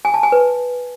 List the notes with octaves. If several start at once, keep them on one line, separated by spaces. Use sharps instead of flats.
G#5
A5
G#5
B4